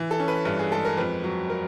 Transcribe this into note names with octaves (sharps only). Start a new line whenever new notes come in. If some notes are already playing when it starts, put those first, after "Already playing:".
Already playing: E3
A4
C#4
B4
G2 B4
G#4
G#3 A4
A#4
F2 B4
F#3
A#4